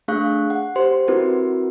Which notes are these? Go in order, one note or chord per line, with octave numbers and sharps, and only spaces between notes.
A3 D4 G#4 F5 C#6 F#6
F#5
G4 C5 C6
C4 E4 F#4 A#4 B4